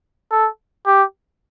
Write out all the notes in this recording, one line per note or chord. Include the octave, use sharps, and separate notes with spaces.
A4
G4